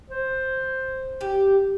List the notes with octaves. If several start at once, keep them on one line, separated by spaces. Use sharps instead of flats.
C5
G4